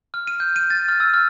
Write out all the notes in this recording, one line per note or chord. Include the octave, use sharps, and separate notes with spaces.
F6
D#7
G6
D#7
A6
F6
E6
F6